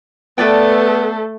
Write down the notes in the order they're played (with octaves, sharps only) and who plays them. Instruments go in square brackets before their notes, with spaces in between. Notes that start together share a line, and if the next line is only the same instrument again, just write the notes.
[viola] A3 A4 [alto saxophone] B3 [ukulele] B4 D5 G5